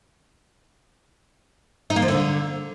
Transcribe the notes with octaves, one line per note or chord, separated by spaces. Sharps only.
D#4
A#3
F3
D3